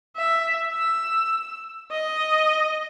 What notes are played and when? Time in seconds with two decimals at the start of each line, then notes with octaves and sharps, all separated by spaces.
0.17 E5
0.73 E6
1.91 D#5